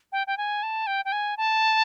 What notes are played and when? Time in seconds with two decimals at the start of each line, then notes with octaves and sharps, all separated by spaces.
0.12 G5
0.27 G5
0.37 G#5
0.63 A5
0.87 G5
1.05 G5
1.12 G#5
1.37 A5